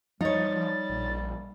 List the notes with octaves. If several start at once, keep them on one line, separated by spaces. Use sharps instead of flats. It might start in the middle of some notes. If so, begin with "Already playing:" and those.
F3 G3 D#4 C#5 A6
A#1